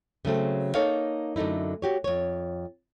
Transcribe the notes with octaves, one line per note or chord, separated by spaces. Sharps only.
C#3 F#3 A3 C4
A#3 D#4 A4 C#5 F5
F#2 D3 A3 D#4 E4
F#4 G4 C#5
F2 C#5